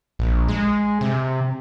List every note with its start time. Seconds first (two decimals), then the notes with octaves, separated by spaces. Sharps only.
0.19 A#1
0.48 G#3
1.01 C3